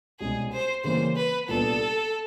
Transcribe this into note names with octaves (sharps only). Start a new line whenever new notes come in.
C2 B2 G#3 C#4 G#4
C5
C#3 E3 G3 A#3 C5
B4
C2 A#2 G3 B3 D4 A4